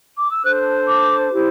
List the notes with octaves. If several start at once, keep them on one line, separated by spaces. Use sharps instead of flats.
D6
E6
D4 A4 C5 F#6
D6
E4 G4 C5